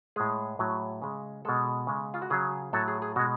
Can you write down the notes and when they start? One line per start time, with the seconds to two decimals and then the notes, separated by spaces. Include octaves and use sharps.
0.16 A2 G#3 G#4
0.59 A2 F#3
1.02 C#3 G#3
1.45 B2 G#3 A4
1.87 C#3 G#3
2.14 F4
2.22 F#4
2.30 C#3 F#3 G#4
2.73 A2 F#3 A4
2.88 G#4
3.02 G#4
3.16 B2 G#3 F#4